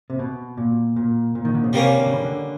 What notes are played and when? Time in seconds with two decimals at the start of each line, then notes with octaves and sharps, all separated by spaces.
0.10 C3
0.19 B2
0.57 A#2
0.96 A#2
1.35 A#2
1.45 D#3
1.55 D3
1.64 C#3
1.73 C3 G3 A#3 C#4
1.99 D3
2.06 C#3
2.14 D3
2.25 D3